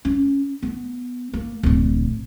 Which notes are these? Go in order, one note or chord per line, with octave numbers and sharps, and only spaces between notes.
C#4
B3
A#3
D1 A#1